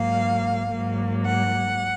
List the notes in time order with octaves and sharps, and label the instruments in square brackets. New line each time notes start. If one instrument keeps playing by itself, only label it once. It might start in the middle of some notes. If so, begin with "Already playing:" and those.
Already playing: [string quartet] G#2 F#3 A#3 F5
G#2 F#3 A#3
F#5